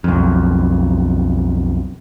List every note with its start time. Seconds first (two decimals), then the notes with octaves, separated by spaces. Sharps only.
0.04 B1 F2